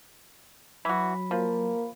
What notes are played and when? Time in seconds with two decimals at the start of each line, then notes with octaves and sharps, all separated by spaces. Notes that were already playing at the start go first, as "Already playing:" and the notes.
0.85 E3 F#3 F#4 B5
1.31 F3 A#3